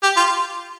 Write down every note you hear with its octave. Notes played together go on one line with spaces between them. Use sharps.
G4
F4